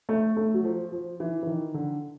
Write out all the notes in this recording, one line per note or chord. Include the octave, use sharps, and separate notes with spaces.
A3
A3
F#3
F3
F3
E3
E3
D#3
D3